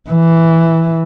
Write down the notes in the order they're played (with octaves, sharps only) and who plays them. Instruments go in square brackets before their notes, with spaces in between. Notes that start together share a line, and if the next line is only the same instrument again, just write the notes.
[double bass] E3